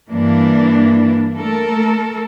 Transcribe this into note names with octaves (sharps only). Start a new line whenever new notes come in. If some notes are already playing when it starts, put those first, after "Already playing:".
G2 E3 A#3 D4
A3 A4 A#4